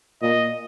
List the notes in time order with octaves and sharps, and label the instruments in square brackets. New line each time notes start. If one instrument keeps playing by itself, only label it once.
[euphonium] A#2 [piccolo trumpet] D#5